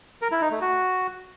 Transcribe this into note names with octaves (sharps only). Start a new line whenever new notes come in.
A#4
E4
D#4
A3
F#4